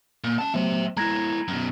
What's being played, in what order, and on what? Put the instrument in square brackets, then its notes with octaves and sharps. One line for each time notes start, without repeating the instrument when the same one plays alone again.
[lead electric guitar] A#2
C#4 A5
[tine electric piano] F#3 A3 B3 [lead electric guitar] C5 E5
[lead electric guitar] G#3 E4 [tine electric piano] A#5 G#6 A#6
[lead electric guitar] F#2 B2